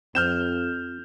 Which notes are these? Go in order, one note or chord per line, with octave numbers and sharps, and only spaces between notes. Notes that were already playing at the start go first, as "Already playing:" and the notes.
F2 C4 F6 G6 E7